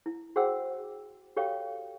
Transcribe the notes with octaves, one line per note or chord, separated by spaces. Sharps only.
E4
F#4 G#4 C5 F#5 G5 E6
F#4 G4 A4 C#5 F5 G5